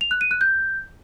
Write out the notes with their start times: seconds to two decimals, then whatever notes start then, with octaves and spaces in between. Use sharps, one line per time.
0.01 F7
0.11 F#6
0.21 D#7
0.31 F#6
0.41 G6